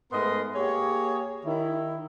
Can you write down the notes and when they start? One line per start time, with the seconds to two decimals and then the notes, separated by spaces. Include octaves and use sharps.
0.12 G#2 A3 B3 A#4 D#5 C6
0.55 A#3 G4 G#4 C#5
1.45 D#3 E4